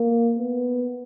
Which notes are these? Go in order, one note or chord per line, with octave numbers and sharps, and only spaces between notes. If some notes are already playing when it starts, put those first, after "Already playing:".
Already playing: A#3
B3